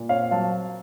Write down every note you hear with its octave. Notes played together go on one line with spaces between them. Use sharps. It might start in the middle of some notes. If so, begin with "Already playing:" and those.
Already playing: A#2
C4 C#5 F5
F#3 F5 A5